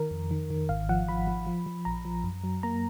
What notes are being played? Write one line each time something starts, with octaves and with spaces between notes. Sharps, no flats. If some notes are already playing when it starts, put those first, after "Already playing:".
Already playing: D#3 A#4
F2
D#3
D#3
G#1 F5
F3 F#5
F3 B5
F3
F3
F3
A#1 A#5
F3
F#2
F#3
A#3 A#5